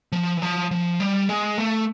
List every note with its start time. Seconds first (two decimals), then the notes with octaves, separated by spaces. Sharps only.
0.12 F3
0.37 E3
0.42 F3
0.71 F3
1.00 G3
1.29 G#3
1.58 A3